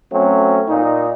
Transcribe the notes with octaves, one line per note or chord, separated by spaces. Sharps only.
F#3 A3 C4 C#4
A#2 D#4